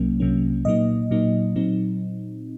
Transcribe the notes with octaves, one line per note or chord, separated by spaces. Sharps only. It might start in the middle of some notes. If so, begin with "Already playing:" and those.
Already playing: C2 C3 F#3 A#3 C#4
C2 C3 F#3 A#3 C#4
A#2 F#3 A#3 D#4 D#5
A#2 F#3 A#3 D#4
A#2 F#3 C4 D#4